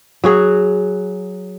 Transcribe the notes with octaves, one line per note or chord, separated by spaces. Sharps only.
F#3 F#4 G#4